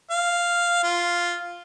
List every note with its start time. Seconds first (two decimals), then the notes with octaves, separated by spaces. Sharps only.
0.10 F5
0.83 F4